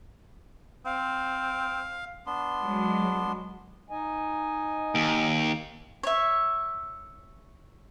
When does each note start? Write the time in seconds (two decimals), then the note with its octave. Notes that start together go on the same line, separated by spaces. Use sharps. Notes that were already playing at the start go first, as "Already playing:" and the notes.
0.86 C4 F5
2.27 B3 D4 C6
2.63 F#3 G#3
3.90 D#4 D#5 G#5
4.95 D#2
6.03 C#5 E5